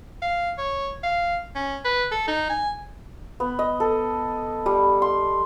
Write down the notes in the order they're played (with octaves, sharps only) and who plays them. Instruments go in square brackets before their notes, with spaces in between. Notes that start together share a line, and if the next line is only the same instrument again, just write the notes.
[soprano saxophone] F5
C#5
F5
C#4
B4
A4
D#4
G#5
[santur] B3
D#5
A4
G3
C6